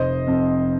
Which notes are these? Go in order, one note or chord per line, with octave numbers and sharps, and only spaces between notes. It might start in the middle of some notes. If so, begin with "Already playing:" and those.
Already playing: F1 C5 D#5
F2